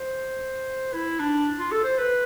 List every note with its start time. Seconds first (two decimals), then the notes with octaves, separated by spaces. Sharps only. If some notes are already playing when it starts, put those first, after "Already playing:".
Already playing: C5
0.94 E4
1.19 D4
1.59 F4
1.72 A4
1.84 C5
1.98 B4